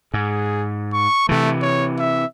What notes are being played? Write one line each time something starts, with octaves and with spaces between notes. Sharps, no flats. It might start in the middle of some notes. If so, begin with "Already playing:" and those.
G#2 G#4
C#6
C3 E3 A3
C#5
E5